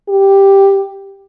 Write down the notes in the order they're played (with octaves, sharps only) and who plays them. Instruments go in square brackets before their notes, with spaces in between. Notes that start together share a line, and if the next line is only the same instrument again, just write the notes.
[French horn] G4